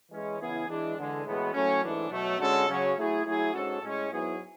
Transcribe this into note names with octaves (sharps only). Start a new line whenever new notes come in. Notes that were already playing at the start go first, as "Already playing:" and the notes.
E3 G#3 C#4
C#3 E3 B3 E4 G#4
E3 G#3 D4
E2 D3 G#3
A2 E3 G#3 B3 F#4
A2 F#3 A3 C#4
G#2 E3 A3 D4
B2 F#3 A3
D3 G#3 C#4 F#4 A4
C#3 F#3 C#4
F#3 A3 E4 G#4
F#3 A3 E4 G#4
G#2 G#3 C#4 F#4 A4
A2 G#3 C#4
G#2 F#3 B3 E4 G#4